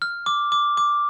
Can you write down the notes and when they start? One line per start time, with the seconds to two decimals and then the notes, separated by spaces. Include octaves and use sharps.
0.02 F6
0.26 D6
0.52 D6
0.77 D6